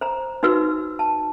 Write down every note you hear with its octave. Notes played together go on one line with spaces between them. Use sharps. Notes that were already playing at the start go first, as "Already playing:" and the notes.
C5 A#5
D#4 F#4 B4 E6
A5